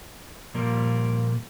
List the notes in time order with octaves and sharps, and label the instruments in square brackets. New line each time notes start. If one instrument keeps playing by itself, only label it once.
[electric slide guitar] A#2 F3 G3 A#3 A#4